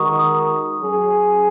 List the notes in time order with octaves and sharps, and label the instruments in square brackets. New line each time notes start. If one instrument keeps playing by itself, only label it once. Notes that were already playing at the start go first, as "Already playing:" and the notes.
Already playing: [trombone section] D#3 G#3 D#4 F#4 A#4 [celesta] C#6 D#6
[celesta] D#6
[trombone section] F#3 C#4 G#4